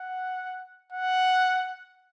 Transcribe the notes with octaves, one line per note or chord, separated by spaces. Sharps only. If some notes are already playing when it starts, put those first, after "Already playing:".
Already playing: F#5
F#5